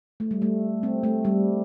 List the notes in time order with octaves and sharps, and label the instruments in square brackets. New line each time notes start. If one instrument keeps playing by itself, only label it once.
[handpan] A3
G3
A3
C4
A3
G3